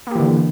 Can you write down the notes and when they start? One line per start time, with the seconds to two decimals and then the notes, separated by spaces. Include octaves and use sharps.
0.07 A#3
0.11 G4
0.15 E3
0.20 D3